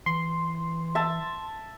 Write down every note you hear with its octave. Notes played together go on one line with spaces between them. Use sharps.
E3 C6
E5 A5